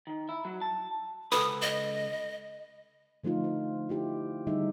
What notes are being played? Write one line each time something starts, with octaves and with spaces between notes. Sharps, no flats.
D#3
E4
F#3
A5
C#2 A4 B4 D#6
D#5
D3 F3 A3 D#4 F4
C5
E4 F4 G4
D3 D#3 G3 D#4 G#4 E5